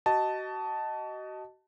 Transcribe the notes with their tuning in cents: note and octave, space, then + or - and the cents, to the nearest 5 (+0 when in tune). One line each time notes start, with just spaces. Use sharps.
F#4 +35 D#5 +0 A5 +0